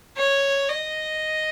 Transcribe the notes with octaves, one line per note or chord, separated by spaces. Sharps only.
C#5
D#5